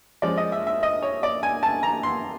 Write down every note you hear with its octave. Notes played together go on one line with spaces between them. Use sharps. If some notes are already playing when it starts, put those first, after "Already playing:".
F3 G#3 C#4 D5
D#5
E5
E5
D#5
C#5
D5
G#5
A5
A#5
C6